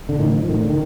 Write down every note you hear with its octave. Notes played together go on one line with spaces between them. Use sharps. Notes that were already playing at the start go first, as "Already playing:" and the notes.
D3
A2 D#3
F3
A2 D#3
D3
D#3